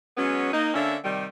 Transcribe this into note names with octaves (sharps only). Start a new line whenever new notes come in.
F#3 G#3 B3 C#4
A#3 D#4
D3 A#3 C#4 D4 E5
C3 D#3 G3